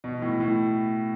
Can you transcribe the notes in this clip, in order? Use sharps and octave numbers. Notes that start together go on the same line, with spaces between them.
B2
A2
A2